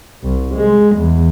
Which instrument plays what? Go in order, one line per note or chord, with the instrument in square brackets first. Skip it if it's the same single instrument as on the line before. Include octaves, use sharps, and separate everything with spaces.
[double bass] C2
G#3
E2